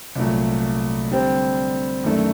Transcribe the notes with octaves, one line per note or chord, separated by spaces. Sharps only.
C2 A#2 F#3 A3
D3 G3 C4
F#2 D#3 A3 D4 A4